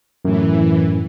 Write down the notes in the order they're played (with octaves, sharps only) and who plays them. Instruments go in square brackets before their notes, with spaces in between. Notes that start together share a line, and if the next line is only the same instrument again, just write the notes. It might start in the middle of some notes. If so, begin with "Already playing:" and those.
[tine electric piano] F#2 A2 [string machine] E3